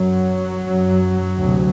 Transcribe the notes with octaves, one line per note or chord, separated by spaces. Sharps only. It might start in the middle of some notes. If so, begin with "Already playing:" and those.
Already playing: F#2 F#3
F#2
D2 C3